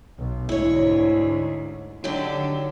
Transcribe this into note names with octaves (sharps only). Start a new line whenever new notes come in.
B1
D2 G#2 E4 C#5
D3 D#3 F#3 G4